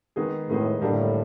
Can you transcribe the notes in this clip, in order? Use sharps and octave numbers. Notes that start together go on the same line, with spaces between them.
D#3 G#3 B3 D#4 G#4
A2 D#3 G#3 B3 D#4 G#4
A2 D3 G3 A#3 D4 G4